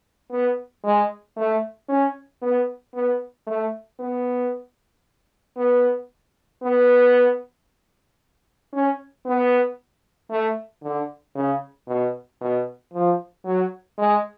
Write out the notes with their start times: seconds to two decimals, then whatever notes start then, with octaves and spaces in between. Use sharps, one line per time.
0.31 B3
0.84 G#3
1.37 A3
1.89 C#4
2.42 B3
2.95 B3
3.47 A3
3.99 B3
5.57 B3
6.63 B3
8.73 C#4
9.26 B3
10.30 A3
10.83 D3
11.36 C#3
11.88 B2
12.41 B2
12.94 F3
13.45 F#3
13.98 G#3